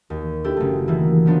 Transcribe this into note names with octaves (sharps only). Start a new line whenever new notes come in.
D#2
D4 E4 G4 A4
F#1 A3
D#3 E3 A#3 E4
F3 F#3 B3 D4 D#4 F4